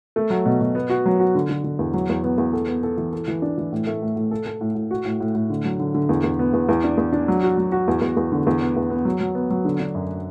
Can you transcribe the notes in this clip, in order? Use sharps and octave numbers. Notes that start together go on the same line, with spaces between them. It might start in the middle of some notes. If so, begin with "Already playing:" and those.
A3
F#3
B2
B2
B3
F#4
F#3
F#4
D3
D3
D3
E2
F#3
E2
B3
E2
A4
B3
A4
E3
A4
E3
D4
E3
A2
A3
A2
A2
A4
A4
A2
A2
F#4
A2
A2
A2
D3
F#3
D3
D3
E2
E2
B3
E2
E2
D4
E2
D4
F#3
F#4
F#3
F#4
E2
E2
E2
D3
E2
B3
E2
B3
F#3
F#3
B3
F#3
D3
D4
F#2